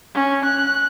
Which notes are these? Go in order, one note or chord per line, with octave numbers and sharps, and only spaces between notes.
C#4
F#6